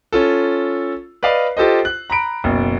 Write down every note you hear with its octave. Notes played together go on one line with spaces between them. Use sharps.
C#4 F4 A4
B4 D5 D#5 F5
F4 G4 A4 C5 D#5
F#6
A#5 B5 D7
F#1 B2